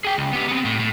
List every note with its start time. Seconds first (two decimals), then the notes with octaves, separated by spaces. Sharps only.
0.04 G#4 G5
0.18 C#2
0.33 B3 G4
0.48 B3 C4
0.65 A2
0.80 A2